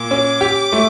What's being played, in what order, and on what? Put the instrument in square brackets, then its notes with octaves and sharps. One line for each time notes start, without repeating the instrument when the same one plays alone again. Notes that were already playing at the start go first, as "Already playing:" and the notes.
Already playing: [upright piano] A#2 [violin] D6
[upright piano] C#4
G4
A3